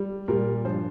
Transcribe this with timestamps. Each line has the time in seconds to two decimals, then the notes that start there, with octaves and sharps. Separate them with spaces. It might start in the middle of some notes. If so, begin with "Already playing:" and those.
Already playing: G3
0.28 A#2 G3 A#4
0.65 G2 F3 C5